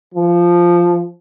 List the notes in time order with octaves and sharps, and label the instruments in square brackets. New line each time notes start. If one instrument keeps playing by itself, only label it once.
[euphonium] F3